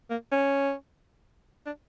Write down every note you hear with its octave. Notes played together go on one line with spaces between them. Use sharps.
A#3
C#4
D4